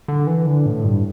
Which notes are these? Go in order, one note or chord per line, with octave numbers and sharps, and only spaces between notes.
D3
E3
D3
A2
G2